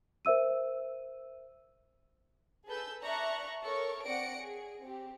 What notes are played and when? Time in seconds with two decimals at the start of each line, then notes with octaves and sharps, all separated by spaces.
0.25 A#4 C5 E5 E6 D#7
2.67 G#4 A4 B4 E6 G6
3.03 D5 E5 A5 A#5 C#6 F#6
3.63 A4 A#4 C#5 C#6
4.06 C4 D5 F#5 A#6 C#7 D7
4.40 G#4
4.82 C4 G4